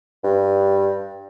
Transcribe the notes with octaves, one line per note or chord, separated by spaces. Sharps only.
G2